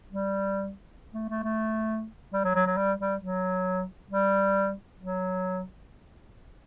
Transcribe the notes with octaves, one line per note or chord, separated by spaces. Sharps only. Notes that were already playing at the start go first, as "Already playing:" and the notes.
G3
A3
A3
A3
G3
F#3
F#3
F#3
G3
G3
F#3
G3
F#3